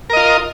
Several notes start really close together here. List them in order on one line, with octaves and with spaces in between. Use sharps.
A#4 D#5 F4